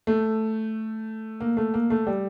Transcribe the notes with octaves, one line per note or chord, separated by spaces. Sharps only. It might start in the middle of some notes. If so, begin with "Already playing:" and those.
A3
A#3
A3
A#3
A3
G3